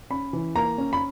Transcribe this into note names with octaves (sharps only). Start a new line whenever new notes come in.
C#4 B5
E3
A#3 A#5
C#4
B5